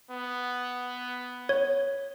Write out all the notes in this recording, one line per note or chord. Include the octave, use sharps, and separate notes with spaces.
B3
C#5